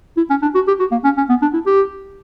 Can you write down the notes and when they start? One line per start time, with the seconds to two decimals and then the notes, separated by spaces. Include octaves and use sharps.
0.17 E4
0.30 C#4
0.42 D4
0.55 F#4
0.68 G4
0.80 F#4
0.92 A#3
1.04 C#4
1.18 C#4
1.30 B3
1.42 D4
1.54 E4
1.67 G4